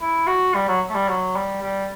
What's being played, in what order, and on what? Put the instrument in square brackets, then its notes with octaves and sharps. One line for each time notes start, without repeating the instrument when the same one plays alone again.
[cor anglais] E4
F#4
G3
F#3
A3
G3
F#3
G3
G3